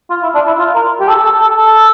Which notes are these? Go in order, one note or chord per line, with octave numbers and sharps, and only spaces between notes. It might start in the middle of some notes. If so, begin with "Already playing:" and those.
F4
E4
D4
E4
F4
A#4
G4
A4
A4
A4
A4